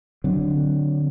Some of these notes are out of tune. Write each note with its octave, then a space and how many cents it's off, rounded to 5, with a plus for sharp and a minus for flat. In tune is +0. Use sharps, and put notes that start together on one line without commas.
D3 +0 F#3 +0 C4 +0